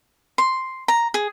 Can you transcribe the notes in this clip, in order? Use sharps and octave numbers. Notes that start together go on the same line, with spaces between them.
C6
A#5
G#4